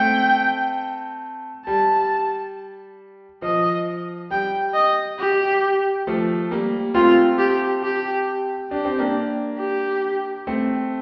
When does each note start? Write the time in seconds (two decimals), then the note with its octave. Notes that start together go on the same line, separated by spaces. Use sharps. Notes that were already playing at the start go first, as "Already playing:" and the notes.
Already playing: A3 C4 G5
1.66 G3 A5
3.42 F3 D#5
4.31 G3 G5
4.74 D#5
5.19 G4
6.07 F3 A3
6.51 G3 A#3
6.94 A3 C4 F4
7.39 G4
7.84 G4
8.71 D4 G4
8.85 C4
8.98 A#3 D4
9.59 G4
10.47 A3 C4